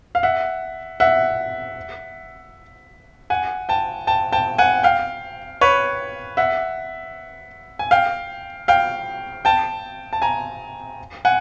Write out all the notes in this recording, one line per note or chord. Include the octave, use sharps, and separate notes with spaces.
F5
E5 F#5
E5 F#5
F#5 G#5
G5 A5
G5 A5
G5 A5
F#5 G#5
F5 G5
B4 C#5
E5 F#5
G#5
F5 G5
F5 G5
G5 A5
A5
G#5 A#5
F#5 G#5